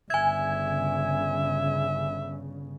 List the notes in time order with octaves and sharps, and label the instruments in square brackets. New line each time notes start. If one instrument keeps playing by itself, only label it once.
[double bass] G1 [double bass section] C#3 [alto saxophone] E5 [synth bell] G#5 G#6